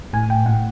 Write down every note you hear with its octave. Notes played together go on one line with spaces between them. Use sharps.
A2 G#5
G5
A2 F#5